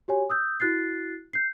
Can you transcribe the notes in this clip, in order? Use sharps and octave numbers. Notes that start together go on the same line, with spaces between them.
F#4 G4 C#5 G#5
D#6 E6 G6
E4 F#4 F#6 A6 C7
G6 C7